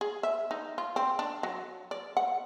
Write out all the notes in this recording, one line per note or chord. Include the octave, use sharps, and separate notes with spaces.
G#4
E5
D#4
F4
C4
D4
F#3
D5
F#5